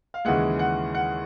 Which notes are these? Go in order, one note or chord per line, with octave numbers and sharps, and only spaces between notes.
F5
D#2 C#3 E3 G#3 F#5
F#5
F#5